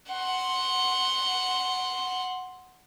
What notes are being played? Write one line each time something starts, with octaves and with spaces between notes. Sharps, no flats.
F#5 C6